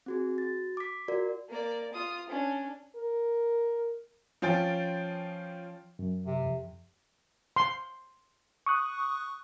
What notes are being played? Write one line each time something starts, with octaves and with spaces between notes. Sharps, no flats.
C4 F#4 G#4
F#4 A6
D6 B6
F4 F#4 A#4 D5
A#3 D5
F4 D#6
C#4 D4
A#4
F3 C#4 F4 G5 A6
F#2
C3
F2
C6
C#6 D#6 F#6